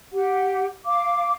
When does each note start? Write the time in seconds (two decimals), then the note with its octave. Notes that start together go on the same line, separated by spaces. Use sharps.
0.11 G4 F#5
0.86 F5 D6